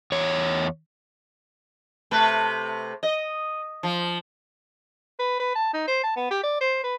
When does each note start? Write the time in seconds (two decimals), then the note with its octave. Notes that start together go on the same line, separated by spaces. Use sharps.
0.12 E2 C#5
2.11 C3 A3 B4
3.03 D#5
3.83 F3
5.19 B4
5.40 B4
5.55 A5
5.74 D#4
5.88 C5
6.03 A5
6.16 B3
6.31 G4
6.43 D5
6.61 C5
6.83 B4